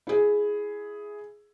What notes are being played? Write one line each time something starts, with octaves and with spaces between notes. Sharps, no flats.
E4 G#4